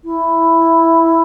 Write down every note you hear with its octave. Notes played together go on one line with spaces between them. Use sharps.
E4